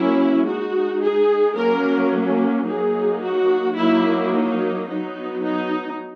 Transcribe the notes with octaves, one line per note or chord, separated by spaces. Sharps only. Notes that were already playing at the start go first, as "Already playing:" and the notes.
Already playing: F#3 A#3 C#4 E4
G#3 D#4 F#4
G#4
F#3 A#3 C#4 A#4
F#3 A#3 D#4 G#4
F#4
F#3 A#3 D#4 E4
D#4
F#3 B3 D#4
D#4